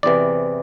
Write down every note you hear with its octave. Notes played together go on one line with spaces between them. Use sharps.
E2 C3 E3 D5